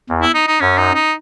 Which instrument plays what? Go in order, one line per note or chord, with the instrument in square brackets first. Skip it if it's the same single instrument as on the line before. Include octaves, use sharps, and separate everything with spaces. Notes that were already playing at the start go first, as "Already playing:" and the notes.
[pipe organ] E2
[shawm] E4
D#4
D#4
[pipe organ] F#2 [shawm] C#4
[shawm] D#4
D#4